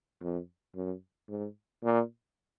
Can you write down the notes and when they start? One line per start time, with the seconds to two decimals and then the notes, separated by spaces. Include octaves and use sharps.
0.22 F2
0.75 F#2
1.29 G#2
1.84 A#2